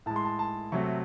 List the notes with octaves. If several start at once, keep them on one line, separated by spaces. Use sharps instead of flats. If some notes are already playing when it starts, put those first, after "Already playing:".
A2 G#3 A5
C6
A5
A5
C3 F#3 A3 C#6